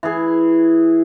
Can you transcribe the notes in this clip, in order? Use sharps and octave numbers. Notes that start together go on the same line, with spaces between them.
E3 G#4